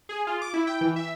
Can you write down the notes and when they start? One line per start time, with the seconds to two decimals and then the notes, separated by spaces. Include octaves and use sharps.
0.09 G#4
0.27 F4
0.42 D6
0.54 E4
0.67 G5
0.81 E3
0.96 E5